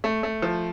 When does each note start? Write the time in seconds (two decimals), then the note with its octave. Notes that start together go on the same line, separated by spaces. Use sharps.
0.04 A3
0.23 A3
0.42 F3